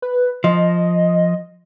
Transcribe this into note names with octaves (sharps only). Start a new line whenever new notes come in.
B4
F3 D#5